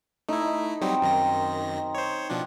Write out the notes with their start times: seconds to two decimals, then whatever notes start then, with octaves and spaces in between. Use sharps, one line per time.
0.29 A3 D#4 E4
0.81 F#3 G3 C4 D#4
1.02 F#2 D#3 A#6
1.95 C5 C#5
2.30 B2 F3 D4